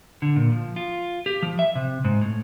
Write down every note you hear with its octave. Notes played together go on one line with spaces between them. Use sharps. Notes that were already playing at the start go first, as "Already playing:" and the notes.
D3
A#2
F3
F4
G4
F3
E5
C3
G#2
A2